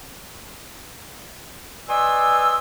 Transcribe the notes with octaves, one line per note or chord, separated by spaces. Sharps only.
B4 D5 D#5 G#5 C6 E6